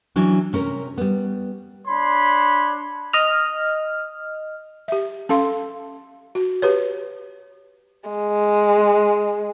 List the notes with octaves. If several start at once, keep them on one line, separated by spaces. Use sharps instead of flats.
E3 F#3 C#4 D4
C3 C#4 A#4
G3 B3
D4 C#5 B5 C6
D#5 F6
G4 E5
C#4 A4 F5 C6
F#4
G4 B4 C#5
G#3